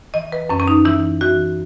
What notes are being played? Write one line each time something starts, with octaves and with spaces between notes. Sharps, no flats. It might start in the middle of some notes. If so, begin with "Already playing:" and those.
E3 D#5
B4
F#2 C#4
C#4
D#4
E3 E4
E3 F#4